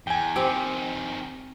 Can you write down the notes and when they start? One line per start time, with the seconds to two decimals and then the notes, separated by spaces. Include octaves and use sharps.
0.07 E2 G5 G#5
0.36 D#3 F3 C4 G4